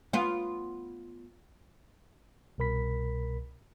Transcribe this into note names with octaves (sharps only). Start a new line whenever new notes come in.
B3 F4
C2 B2 A#4 B5 B6